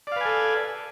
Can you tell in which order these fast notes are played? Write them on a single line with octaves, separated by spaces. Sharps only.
D5 F5 B4 G#5 A4